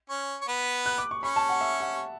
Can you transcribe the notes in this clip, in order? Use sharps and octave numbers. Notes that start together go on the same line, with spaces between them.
C#4 C#5
C#5
B3 B4
F#6
D6
C#6
C#4 C#5 B5
A5
F#5
E5
F#5